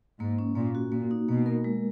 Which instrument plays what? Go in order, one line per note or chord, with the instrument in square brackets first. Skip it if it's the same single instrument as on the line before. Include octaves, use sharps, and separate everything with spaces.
[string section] G#2 [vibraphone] A#3
[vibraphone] C#4
[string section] A#2 [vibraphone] A#3
[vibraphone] F#4
[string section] A#2 [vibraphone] A#3
[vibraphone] D#4
[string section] B2 [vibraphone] A#3
[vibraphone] A#4
G#3